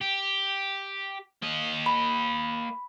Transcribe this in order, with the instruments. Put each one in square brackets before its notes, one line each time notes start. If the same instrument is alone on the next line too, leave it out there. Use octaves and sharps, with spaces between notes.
[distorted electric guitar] G4
A#3 D#5
[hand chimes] B5